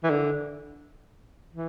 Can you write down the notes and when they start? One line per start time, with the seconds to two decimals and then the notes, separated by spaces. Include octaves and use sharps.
0.04 E3
0.10 D3
1.53 E3